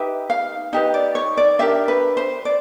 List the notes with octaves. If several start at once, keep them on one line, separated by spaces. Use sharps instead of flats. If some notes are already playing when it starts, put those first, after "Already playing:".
Already playing: D#4 G4 B4 E5
F5
D#4 G4 B4 D#5
D5
C#5
D5
D4 G4 A#4 E5
B4
C5
D5